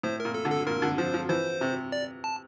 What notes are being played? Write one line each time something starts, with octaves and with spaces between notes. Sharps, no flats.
A2 C5
A#2 A#4
A4
D3
A4
A#2 A#4
D3
F3 C5
F3
E3 C5
C3
D5
A5